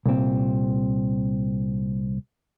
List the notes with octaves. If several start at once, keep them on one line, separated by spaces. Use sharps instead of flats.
C2 A#2 C4